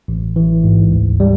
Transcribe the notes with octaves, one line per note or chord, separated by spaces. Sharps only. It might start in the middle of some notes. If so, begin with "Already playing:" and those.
A1
E3
G#2
D2
G3